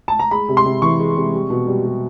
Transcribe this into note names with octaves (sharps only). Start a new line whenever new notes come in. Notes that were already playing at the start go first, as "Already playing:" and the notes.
A5
A#5
G#3 B5
C3
C6
C3
E3 C#6
G#3
C3
G3
B2
G3
G3